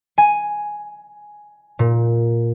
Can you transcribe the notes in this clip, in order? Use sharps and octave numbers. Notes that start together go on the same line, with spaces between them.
G#5
A#2